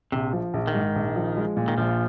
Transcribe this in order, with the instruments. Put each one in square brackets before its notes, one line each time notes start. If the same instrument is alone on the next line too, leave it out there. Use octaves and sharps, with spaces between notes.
[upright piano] A#1 [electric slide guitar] C3
[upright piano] F3
A#1
[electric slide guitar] D#3
[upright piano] G#2
A#1
F3
G#3
A#2
[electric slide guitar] D#3
[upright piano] A#1 [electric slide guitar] F3